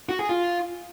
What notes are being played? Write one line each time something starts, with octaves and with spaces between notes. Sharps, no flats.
F#4
G#4
F4